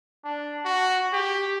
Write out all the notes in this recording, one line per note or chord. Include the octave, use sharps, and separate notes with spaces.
D4
F#4
G4